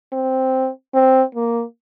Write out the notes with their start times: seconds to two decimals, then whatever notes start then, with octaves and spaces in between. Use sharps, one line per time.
0.13 C4
0.94 C4
1.35 A#3